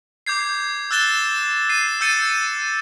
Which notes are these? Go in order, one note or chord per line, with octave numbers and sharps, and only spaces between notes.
D6 G6 G#6 C7
E6 F#6 A6 E7 G7
C7 D#7
E6 G6 A6 C#7 D#7
D#7